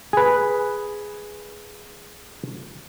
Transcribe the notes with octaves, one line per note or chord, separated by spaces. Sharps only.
G#4 B4